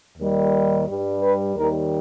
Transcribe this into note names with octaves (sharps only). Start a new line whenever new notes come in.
D#2 D#3 G3
G2 G3
B4
D#2 D#3 G3 A#4